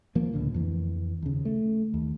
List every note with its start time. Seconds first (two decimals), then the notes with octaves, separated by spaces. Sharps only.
0.15 D#1 F3 A#3
0.34 C#2 A2 D3
0.54 F2 E3
1.22 D#2 C#3
1.45 A3
1.94 D#2